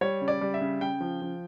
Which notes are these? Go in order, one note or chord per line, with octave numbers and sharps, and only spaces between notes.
G3 C#5
C#3
D5
G3
E5
C#3
C#3 G5
F3
F3